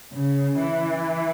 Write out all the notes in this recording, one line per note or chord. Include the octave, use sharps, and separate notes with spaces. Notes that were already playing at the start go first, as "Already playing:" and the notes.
C#3
E3